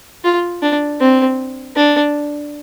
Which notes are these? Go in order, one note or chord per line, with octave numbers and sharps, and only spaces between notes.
F4
D4
C4
D4